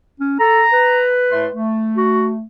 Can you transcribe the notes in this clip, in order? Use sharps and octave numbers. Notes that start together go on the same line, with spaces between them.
C#4
A4 A#5
B4
A2 A3 C6
A3
F#4